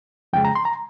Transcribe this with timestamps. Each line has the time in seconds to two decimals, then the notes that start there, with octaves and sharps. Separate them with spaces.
0.33 F2 C#3 G#3 G5
0.45 A#5
0.55 C6
0.65 A#5